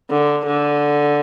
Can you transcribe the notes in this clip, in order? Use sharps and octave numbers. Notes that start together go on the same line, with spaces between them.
D3
D3